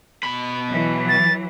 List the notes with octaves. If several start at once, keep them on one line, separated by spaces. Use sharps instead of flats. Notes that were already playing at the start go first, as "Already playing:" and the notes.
B2 B5
E3 F#3
A6